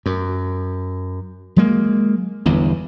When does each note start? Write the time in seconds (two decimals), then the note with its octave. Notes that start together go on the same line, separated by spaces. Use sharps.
0.06 F#2
1.56 F#3 G#3 A#3
2.46 G1 E2 G2